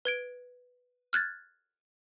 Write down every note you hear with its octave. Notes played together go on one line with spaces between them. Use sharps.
B4 G#6 D7
F6 F#6 G#6 A6